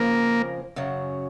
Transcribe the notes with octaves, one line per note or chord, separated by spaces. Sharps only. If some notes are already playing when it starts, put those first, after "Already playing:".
Already playing: F2 C#3 F3 A#3
F#2 C#3 F#3